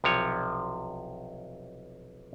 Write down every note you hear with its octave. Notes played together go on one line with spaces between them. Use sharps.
B1 C3 F3 C#5